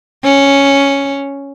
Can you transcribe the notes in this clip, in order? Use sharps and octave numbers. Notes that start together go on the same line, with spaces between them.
C#4